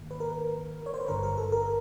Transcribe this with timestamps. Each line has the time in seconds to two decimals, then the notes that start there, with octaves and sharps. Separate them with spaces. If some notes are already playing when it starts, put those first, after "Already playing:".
Already playing: G#2 D#3 A#3
0.11 B4
0.20 A#4
0.86 C#5
0.94 C5
1.01 B4
1.08 G#1 G2 D3 A#4
1.23 A#4
1.37 A4
1.52 A#4